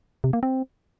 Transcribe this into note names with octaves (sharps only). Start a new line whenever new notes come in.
C3
A#3
C4